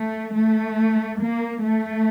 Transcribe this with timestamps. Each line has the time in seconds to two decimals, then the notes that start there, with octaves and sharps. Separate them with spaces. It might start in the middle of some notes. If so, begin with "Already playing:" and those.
Already playing: A3
0.35 A3
1.21 A#3
1.64 A3